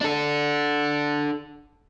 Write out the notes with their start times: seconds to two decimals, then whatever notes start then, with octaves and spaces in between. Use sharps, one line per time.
0.01 D4 A4